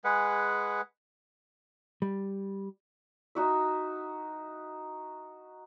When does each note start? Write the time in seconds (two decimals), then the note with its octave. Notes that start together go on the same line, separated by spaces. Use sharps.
0.04 G#3 G#4 B4 F#5
2.02 G3
3.35 D#4 F#4 E5